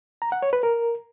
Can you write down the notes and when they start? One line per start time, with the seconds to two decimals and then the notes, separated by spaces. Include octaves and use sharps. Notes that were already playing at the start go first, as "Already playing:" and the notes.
0.22 A#5
0.32 F#5
0.42 C#5
0.53 B4
0.63 A#4